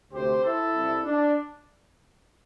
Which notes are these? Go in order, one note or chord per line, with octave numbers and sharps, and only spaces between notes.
D2 C3 A3 G4 C5
E4 A4
C2 C3 G3
D4